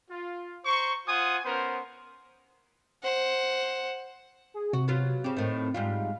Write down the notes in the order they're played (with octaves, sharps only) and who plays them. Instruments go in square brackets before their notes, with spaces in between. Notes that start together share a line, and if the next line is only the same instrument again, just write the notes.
[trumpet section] F4
C5 A#5 C#6
F4 C5 F#5 G#5 D#6
B3 C#4 A#4 C5
[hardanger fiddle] C5 F#5
[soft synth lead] G#4
[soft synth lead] C3 [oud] F#4
[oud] F#3 B3 F4
[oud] C#3 G4 [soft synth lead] C4
[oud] A2 D#3
[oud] G#2 G3 F4 [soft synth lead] F5